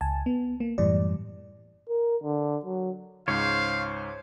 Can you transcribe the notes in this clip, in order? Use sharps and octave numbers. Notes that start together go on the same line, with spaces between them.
C#2 G#5 A5
B3
A#3
F#2 A2 E3 G3 D5
A#4
D3
F#3
C#2 G#2 C5 C#5 F5